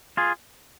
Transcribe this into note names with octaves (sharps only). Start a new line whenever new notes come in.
F4 G#4